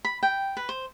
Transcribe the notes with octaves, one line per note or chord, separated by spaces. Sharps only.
B5
G5
B4
C5